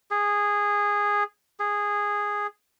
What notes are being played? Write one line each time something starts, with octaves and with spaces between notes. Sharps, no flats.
G#4
G#4